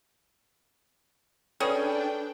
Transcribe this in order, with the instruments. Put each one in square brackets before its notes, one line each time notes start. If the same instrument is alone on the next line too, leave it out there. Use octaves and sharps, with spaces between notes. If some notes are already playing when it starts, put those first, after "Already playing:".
[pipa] G3 C#4 G#4 [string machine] D4 G5 [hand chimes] A4 B4